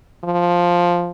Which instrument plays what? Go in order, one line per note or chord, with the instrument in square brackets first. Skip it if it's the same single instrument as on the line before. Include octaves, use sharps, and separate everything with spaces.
[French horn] F3